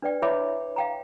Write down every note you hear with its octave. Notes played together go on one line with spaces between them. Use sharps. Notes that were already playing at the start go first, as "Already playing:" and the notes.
D4 B4 D5 G5
E4 B4 C#5 E5 B5 D6
F5 G5 A#5